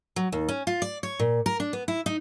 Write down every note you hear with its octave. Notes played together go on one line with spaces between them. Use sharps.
F#3
D#2
C#4
F4
D5
C#5
A#2
A#4
D4
B3
E4
D#4